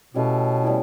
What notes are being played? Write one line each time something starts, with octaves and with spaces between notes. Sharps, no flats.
B2 E3 A3 C#4 G4
E3 G3 B3 E4